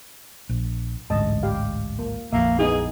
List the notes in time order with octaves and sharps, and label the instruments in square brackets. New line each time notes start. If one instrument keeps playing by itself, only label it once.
[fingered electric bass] A#1
[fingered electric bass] A1 D2 G#2 [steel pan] D#5 A5
[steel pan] G4 F5
A#3
[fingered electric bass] A#1 F2 [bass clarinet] A#3 [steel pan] E5
[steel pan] B3 D#4 E4 [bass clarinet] G#4